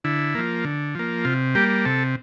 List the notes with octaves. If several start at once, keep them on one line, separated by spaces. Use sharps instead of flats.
D3 E4
F3 A#3
D3
F3 A#3
C3 F4
G3 A#3 G4
C3 A4